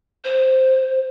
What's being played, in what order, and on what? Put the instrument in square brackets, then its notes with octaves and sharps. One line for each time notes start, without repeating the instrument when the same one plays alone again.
[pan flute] C5